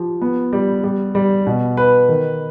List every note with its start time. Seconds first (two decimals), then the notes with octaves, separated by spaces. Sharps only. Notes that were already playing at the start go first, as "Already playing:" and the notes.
Already playing: F3 G4
0.21 B3
0.53 G3
0.84 G3
1.15 G3
1.47 B2
1.77 B4
2.09 D#3